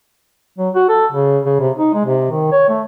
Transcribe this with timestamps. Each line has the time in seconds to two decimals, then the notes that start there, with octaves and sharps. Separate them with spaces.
0.59 F#3
0.75 F#4
0.89 A4
1.12 C#3
1.46 C#3
1.60 C3
1.78 D#4
1.94 G#3
2.06 C3
2.31 D#3
2.52 C#5
2.70 A3